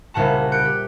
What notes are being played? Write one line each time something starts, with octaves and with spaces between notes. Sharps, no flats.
C2 A#2 C#3 F#5 A5
F#6 G6 C#7 D7
G4